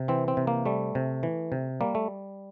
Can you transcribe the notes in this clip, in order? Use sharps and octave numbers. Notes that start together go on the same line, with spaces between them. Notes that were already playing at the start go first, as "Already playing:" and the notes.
Already playing: C3
E3 C4
C4
C3
A#3
G3 A3
C3
E3
C3
G3 A#3
A3